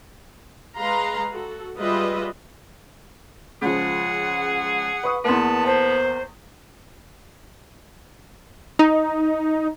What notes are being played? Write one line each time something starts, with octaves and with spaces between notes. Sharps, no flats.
G#3 B4 F5 A#5 C6
F#4 A4
G3 G#3 F4 B4 D#5 E5
C#2 F3 G#4 F#5
B4 C#6 D#6
E2 A#3 B3 B4 A5 C6
C5 A5
D#4